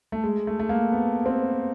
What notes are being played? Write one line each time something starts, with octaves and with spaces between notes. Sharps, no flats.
A3
G#3
A3
A3
A#3
B3
C4